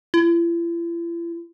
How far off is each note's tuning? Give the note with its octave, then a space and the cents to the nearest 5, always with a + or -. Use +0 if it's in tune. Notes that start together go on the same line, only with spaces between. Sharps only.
E4 +45